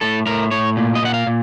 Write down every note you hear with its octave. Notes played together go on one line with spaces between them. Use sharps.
A2 A4
A2 A#4
A2 C#5
A#2
D#5
A#2 F#5
F5
A#2